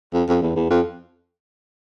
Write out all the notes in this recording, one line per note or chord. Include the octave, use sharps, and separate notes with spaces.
F2
F2
E2
E2
F2